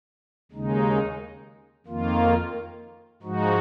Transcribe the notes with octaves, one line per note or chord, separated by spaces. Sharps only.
D#2 C#3 G#3 D#4
F2 D#3 A#3 F4
G#2 F3 G#3 D#4 F#4